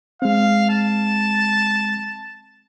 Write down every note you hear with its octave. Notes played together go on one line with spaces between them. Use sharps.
G#3 C4 F5
A5